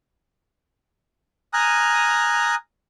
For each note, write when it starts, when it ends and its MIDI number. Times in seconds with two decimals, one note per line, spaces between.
1.53 2.55 80
1.53 2.55 82
1.53 2.55 87
1.53 2.55 89
1.53 2.55 90